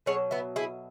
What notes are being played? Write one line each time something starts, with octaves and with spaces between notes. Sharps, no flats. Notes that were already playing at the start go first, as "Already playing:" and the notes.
B2 F#3 G#4 C#5
B3 E4
E4 G#4